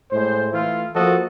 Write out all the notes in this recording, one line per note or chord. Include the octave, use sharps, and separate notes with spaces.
A2 G#3 C5
E3 A3 E4 F4
F3 A#3 F#4 A4 D#5